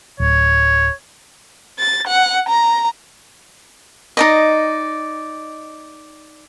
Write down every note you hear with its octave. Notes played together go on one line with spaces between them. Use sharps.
D1 C#5
A6
F#5
A#5
D#4 D5 D#5